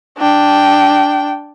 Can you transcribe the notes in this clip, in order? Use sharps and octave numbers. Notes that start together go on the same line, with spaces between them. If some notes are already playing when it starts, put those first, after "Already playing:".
D4 G5